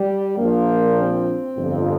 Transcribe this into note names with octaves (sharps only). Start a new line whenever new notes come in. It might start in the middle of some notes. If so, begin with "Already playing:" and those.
Already playing: G3
A#1 A#2 F3 A#3
C4
G1 F2 F3